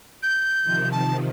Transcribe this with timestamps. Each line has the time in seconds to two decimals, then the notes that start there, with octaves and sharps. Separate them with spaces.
0.23 G6
0.63 C3 D#3 F3
0.92 A5